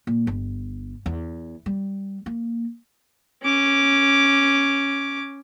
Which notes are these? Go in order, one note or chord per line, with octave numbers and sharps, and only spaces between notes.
A#2
G1
E2
G3
A#3
C#4 D6